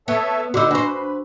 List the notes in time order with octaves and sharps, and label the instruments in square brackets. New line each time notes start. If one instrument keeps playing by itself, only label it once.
[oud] B3 [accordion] A4 C#5 E5
[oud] D3 D#4 [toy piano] F#4 D6 E6 [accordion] B4
[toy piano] D4 C#6 [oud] F#4 C5